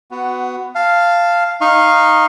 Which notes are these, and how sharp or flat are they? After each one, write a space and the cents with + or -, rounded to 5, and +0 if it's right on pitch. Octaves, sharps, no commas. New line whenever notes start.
B3 +15 F#4 +0
F5 -5 A5 +0
D#4 +0 F5 +0 C#6 -30